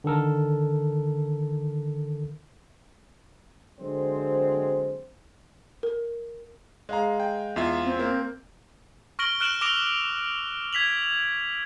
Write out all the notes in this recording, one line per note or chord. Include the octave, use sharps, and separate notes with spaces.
D3 D#3 A4 A#4
D3 F#3 G#3 C4 C5
A#4
G#3 F5 A#5
G5
E2 F4 E5
C4
A#3
C#6 F6 A#6 D7 F#7 G7
F6 F#6 D7 E7 F#7
D6 E6 A#6 D7 F7 G7
G#6 B6 F7 F#7